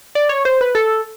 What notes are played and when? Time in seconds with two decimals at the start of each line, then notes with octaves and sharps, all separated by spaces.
0.15 D5
0.29 C#5
0.45 C5
0.61 B4
0.75 A4